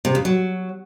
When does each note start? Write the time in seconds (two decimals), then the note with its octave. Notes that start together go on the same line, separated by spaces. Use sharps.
0.05 C3
0.15 F2
0.25 F#3